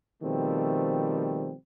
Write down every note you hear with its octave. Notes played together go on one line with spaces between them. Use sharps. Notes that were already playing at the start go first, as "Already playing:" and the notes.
B2 D#3 F3 G3 A3 C4